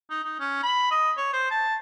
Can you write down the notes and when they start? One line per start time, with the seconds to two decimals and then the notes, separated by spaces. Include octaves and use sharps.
0.10 D#4
0.24 D#4
0.39 C#4
0.63 B5
0.91 D#5
1.17 C#5
1.33 C5
1.51 A5